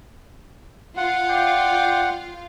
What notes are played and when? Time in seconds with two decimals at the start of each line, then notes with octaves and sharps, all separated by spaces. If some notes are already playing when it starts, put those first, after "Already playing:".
0.97 F4 F5 F#5
1.28 D5 G5